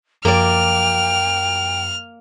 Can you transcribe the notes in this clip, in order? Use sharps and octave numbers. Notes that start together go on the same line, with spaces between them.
F#2 F3 A#3 D5 G5 F6